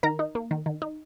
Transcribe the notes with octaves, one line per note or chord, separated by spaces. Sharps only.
D#3 A#4 A#5
D#4
A#3
D#3
D#3
D#4